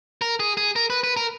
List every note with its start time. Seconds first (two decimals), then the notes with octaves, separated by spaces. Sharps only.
0.22 A#4
0.40 G#4
0.57 G#4
0.76 A#4
0.90 B4
1.04 B4
1.17 A#4